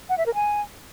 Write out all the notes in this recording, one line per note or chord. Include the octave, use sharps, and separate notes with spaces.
F#5
E5
A#4
G#5